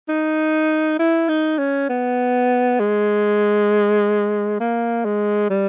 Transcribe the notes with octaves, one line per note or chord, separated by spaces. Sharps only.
D#4
E4
D#4
C#4
B3
G#3
A#3
G#3
G3